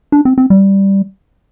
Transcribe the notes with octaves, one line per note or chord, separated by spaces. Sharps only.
D4
C4
C4
G3